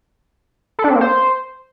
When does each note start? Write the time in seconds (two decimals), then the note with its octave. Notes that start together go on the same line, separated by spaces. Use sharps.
0.79 A4
0.84 D4
0.90 C4
0.95 A#3
1.01 C5